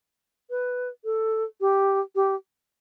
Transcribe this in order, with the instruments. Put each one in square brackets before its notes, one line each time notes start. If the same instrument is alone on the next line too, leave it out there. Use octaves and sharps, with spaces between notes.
[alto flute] B4
A4
G4
G4